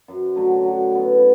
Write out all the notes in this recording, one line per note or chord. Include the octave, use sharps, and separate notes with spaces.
F#2
D3 F#3 A3
F#3
B3 E4
C#3